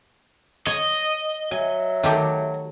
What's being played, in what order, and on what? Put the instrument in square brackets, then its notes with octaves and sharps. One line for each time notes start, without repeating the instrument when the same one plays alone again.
[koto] C#5 [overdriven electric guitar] D#5
[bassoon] F#3 [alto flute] E5 [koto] G#5
[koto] D#3 A3 G4